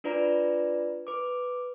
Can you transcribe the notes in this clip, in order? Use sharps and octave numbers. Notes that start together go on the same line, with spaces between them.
D4 F4 B4 D5 A#5
B4 D6